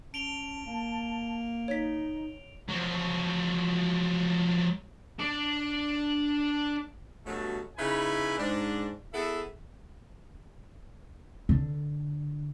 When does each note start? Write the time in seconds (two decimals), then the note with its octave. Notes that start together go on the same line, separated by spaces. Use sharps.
0.14 C#4 A5 D7 F7 G7
0.66 A#3
1.68 D#4 C#5 B6
2.69 F3 F#3
5.19 D4 D5
7.26 G2 B2 F#3 A3
7.78 C#3 D#4 E4 B4 G#5 B5
8.38 G#2 D4
9.13 B3 E4 G#4 A4 E5
11.49 D3